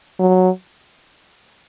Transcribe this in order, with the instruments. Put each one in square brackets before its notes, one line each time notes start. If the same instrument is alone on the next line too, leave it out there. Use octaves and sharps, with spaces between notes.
[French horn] F#3